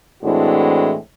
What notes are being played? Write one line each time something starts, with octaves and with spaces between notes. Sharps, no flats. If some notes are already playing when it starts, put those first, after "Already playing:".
A2 E3 G#3 C4 D4 F#4